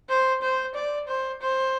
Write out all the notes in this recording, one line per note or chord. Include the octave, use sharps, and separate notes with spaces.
C5
C5
D5
C5
C5